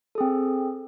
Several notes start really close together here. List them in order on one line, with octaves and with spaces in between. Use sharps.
A4 G#4 C4